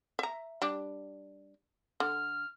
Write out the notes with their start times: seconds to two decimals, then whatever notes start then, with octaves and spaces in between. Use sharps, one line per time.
0.19 E5 A#5
0.62 G3 D4
2.00 D3 F6